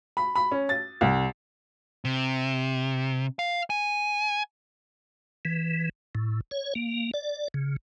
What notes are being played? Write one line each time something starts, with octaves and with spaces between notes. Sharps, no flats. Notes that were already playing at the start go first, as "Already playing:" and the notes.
B5
B5
C#4
A6
C2
C3
F5
G#5
E3
A2
C#5
A#3
D5
C#3